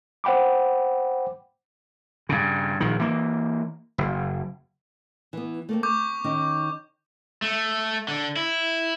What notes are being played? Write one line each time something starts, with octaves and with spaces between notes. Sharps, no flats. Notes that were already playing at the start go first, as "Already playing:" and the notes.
C5 F#5 G5 B5 D6
G2 C#3
A#1 D#3
E3 A#3
F#1
E3 B3
A3 A#3 C4
C4 C#6 D6 G6
D#3 C#4 D#4
A3
D3
E4